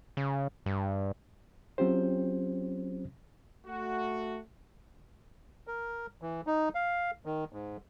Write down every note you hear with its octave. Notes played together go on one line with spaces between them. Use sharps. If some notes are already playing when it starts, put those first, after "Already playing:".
C#3
G2
F#3 C4 C#4 F4 G4 C5
A3 F#4
A#4
E3
D#4
F5
D#3
G#2